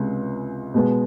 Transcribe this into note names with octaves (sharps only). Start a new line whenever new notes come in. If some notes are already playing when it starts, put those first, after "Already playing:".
Already playing: C#2 C3 G#3
B2 G#3 B3